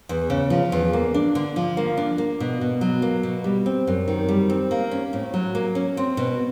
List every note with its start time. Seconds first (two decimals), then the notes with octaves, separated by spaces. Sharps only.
0.09 E2
0.30 C#3
0.50 F3
0.72 E2
0.93 A#3
1.14 D4
1.35 D3
1.56 F3
1.77 A#3
1.97 D4
2.18 A#3
2.40 B2
2.61 B2
2.81 F#3
3.02 A#3
3.23 B2
3.44 G3
3.66 C4
3.87 F#2
4.08 D#3
4.28 G3
4.50 C4
4.71 A#3
4.91 C#4
5.13 A2
5.34 F#3
5.55 A#3
5.75 C#4
5.97 C4
6.17 B2